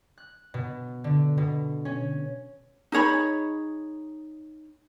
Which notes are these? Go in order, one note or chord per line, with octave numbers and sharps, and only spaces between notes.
F#6
B2
D3
B2
C#4
D#4 G#4 C#5 B5